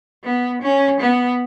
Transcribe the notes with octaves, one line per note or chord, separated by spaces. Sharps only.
B3
C#4
B3